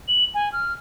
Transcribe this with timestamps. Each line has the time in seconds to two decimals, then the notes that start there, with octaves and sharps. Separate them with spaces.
0.08 F#7
0.34 G#5
0.53 F6